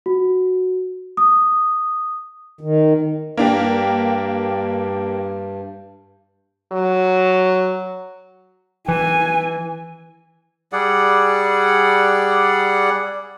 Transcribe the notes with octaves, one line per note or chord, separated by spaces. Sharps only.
F#4
D#6
D#3
G2 A#3 D4 G4
F#3
E3 G#5
G3 G#4 D5 F#5